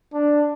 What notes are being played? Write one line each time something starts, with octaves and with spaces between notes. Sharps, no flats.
D4